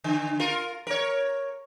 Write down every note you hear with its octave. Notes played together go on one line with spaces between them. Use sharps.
D3
F4 A#4
A#4 C#5